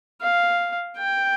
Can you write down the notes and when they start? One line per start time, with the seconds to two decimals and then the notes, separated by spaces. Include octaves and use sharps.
0.21 F5
0.98 G5